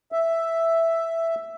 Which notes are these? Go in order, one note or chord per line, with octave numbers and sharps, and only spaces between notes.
E5